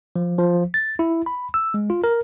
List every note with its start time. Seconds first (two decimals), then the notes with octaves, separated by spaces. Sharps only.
0.16 F3
0.39 F3
0.74 A6
0.99 E4
1.26 B5
1.54 E6
1.74 G#3
1.90 F4
2.04 A#4